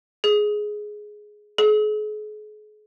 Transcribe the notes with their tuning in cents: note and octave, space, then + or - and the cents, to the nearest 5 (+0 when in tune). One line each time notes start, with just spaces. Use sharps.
G#4 +10
G#4 +40